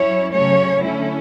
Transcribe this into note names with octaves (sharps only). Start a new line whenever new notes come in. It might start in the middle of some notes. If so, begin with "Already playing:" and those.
Already playing: F#3 C#4 E4 C#5
C#3 F#3 A3 C#4 C#5
D3 A3 C#4 E4